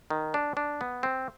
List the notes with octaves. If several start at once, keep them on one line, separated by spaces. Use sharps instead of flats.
D#3
D4
D4
B3
C4